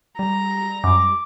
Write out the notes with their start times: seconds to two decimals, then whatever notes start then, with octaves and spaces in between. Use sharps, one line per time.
0.19 G3 A#5
0.84 F#2 D6